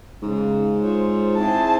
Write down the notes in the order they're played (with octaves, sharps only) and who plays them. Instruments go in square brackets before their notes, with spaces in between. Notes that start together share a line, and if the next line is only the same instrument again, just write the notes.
[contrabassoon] G#2 [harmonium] C#3
[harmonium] F4 C5 C#5
[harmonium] C4 E4 G#4 [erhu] A5